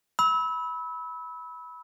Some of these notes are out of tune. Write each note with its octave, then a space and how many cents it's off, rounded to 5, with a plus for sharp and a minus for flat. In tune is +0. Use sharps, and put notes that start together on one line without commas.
B5 -10 E6 -30